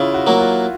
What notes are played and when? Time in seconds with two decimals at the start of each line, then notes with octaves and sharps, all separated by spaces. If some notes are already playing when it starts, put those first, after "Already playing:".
Already playing: C#3 E4 F4
0.14 F#4
0.27 F#3 A#3
0.39 F4